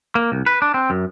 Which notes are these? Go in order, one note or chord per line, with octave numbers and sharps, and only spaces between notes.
A#3
C2
B4
D4
C4
F#2